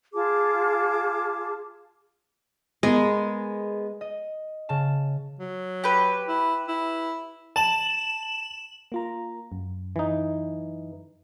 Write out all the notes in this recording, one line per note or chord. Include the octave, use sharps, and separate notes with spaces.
F4 G#4 A5 D6
G#3 B3 G#4 A#4
D#5
C#3 A5
F#3
G4 B4
E4
E4
A5 E7 F#7
A#3 F4 A#5
F#2
E3 D#4